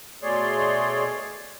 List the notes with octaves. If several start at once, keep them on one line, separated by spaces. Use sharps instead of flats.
B2 A3 G#4 C#5 D5 C6